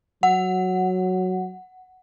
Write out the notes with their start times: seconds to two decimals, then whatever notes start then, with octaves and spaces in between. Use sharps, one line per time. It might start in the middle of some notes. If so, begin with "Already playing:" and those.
0.23 F#3 F#5